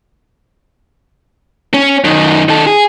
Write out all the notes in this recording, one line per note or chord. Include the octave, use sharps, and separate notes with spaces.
C#4
F#2 D#3
D#3 A4
G#4